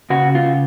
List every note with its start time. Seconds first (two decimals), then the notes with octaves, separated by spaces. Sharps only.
0.10 C#3 F#4
0.35 F4